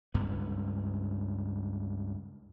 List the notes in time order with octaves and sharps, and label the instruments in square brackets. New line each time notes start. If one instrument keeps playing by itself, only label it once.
[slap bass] C#2 G2 B3